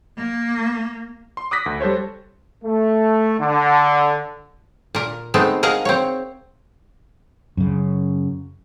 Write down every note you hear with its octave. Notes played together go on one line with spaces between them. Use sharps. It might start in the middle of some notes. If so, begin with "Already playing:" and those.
A#3
C6
D6 D#6 F#6 A#6 B6
D2
G3 A4 C5 C#5
A3
D3
A#2 A#4
G#3 A3 B3 C4 D#4
G#4 A#4 D#5 F5 F#5
C4 C#5
F#2 C#3